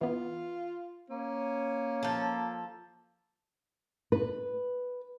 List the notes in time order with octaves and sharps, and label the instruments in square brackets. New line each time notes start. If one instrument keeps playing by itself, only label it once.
[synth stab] E3 B3 [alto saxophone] F4
[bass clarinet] A#3 [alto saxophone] C#4
[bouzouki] F3 A4
[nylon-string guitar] B4